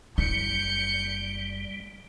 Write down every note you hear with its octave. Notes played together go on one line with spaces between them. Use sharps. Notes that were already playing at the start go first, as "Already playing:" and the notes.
F#1 G3 E4 G6 C#7